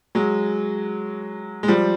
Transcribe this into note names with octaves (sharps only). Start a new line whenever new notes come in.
F#3 G#3
G#3
F3 G3